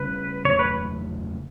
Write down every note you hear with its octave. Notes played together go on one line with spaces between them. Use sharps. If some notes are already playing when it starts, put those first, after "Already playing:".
Already playing: C#3 G3 C#4 B4
E2 C#3 F#3 A3 C#5
B4